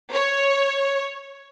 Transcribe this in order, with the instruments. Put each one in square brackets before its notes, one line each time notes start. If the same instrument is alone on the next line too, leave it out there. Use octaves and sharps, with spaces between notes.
[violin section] C#5